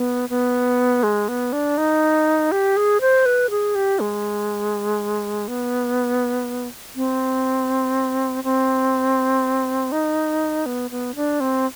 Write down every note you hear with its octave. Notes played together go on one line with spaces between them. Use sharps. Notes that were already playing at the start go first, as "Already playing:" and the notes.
Already playing: B3
B3
G#3
B3
D4
D#4
G4
G#4
C5
B4
G#4
G4
G#3
B3
C4
C4
D#4
B3
B3
D4
C4